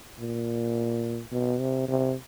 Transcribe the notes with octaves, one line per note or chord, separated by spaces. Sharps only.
A#2
B2
C3
C3